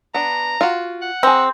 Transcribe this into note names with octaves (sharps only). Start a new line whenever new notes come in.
B3 D4 A#5
F4 F#4
F#5
C4 G#4 A#5